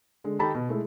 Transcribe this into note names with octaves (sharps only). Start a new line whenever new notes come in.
D3 G#3
D#3 D#4 G4 A4 A5 B5
B2
G#3 A3 E4